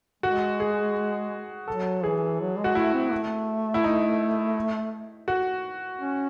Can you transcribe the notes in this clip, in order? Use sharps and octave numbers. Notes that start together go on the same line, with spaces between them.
G#3 F#4
G#4
F#3 A4
E3 G#4
F#3
G#3
F#4
A3 E4
C4
A3
E4
D#4
F#4
C#4